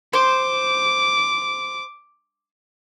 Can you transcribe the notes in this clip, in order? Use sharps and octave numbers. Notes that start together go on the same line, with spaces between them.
C5 D6